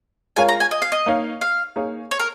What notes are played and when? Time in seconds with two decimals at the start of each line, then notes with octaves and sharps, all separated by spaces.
0.36 G#3 F4 A#4 C#5 F5 G#5
0.48 A#5
0.60 G#5
0.71 D#5
0.82 F5
0.92 D#5
1.06 A#3 D#4 C#5 F5
1.41 F5
1.76 A#3 D#4 G#4 C#5 F5
2.11 C#5
2.19 A#4